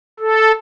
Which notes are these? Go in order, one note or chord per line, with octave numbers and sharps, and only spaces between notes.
A4